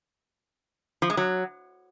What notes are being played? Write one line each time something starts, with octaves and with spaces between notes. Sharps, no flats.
F3
G#3
F#3